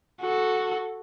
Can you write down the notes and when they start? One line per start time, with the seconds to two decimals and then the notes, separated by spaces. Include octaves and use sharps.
0.21 F#4 A4